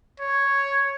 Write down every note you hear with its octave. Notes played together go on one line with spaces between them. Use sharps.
C#5